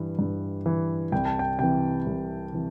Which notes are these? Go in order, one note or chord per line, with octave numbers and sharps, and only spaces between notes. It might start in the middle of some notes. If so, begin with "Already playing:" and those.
Already playing: G2 E3
G2
E3
C2 G5
A5
G5
C3 E3 G5
C2
C3 E3